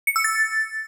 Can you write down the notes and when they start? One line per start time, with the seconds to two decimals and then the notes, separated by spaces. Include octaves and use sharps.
0.07 C#7
0.16 E6
0.24 A6